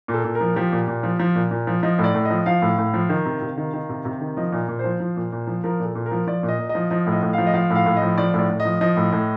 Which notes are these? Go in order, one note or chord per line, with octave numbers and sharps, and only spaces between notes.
A#2
A4
A#2
A#4
F3
F3 G4
A#2
A#2
F3
F3
A#2
A#2
F3
F3 D#5
A2
D5
A2
D#5
F3
F3 F5
A2
A2
F3
D#3
C3
C3
D#3
D#3
C3
C3
D#3
F3 D#5
A#2
A#2
F3 C5
F3
A#2
A#2
F3
F3 A#4
A#2
A4
A#2
A#4
F3
F3 D5
A#2
D#5
A#2
D#5
F3
F3 D#5
A2
D#5
A2
F3 F5
D#5
F3 F5
A2
F5
A2
D#5
F3
F3 D5
A2 D5
A2
D#5
F3
F3 D#5
A2
A2